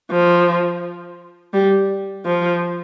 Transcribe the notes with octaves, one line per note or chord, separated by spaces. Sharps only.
F3
G3
F3